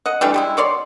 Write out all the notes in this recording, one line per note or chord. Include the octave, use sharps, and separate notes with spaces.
D#5 F#5
E3 G3 A3 D4
G3 G#3 E4
B2 C#5 D5 C6